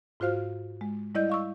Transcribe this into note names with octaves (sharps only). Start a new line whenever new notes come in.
G#2 F4 F#4 C5 F5 F6
G#3
G3 E4 D5 D#5 G6
F5 C#6 E6